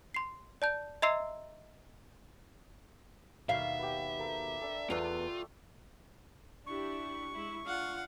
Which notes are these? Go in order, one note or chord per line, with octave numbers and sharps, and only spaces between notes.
C6 C7
D5 A5 G6
D#5 E5 A#5 C6 E6 C7
D#2 B2 E5 F5
B3 G4
A4 A#4
D4 A4
E2 A3 B3 F4 A5
D4 E4 G4 C#6
G#3 E4
D4 F4 F5 F#5